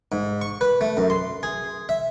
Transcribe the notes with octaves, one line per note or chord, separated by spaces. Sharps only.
G#2
C#6
B4
A3
F#2
C6
G#4
E5